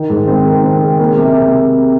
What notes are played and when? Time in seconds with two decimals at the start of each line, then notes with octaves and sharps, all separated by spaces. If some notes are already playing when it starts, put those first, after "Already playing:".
Already playing: D#3
0.10 G#2
0.27 C4
0.45 D#3
0.64 C4
0.81 G#3
1.00 A#3
1.17 C3